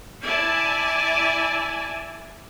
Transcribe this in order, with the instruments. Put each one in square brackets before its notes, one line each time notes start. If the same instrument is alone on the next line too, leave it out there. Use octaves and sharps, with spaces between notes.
[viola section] E4 D5 G#5 A5